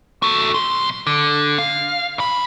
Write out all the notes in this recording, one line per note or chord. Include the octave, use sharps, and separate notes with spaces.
F#4 A4
B1 C6
D3
F5
F2 B5